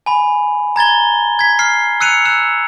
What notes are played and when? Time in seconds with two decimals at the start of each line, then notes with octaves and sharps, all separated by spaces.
0.06 G#5 B5
0.76 A#5 G#6 A6 G7
1.39 G#6 B6
1.59 F6 C7
2.01 E6 F#6 C#7 D#7 F7
2.25 E6 F#6 E7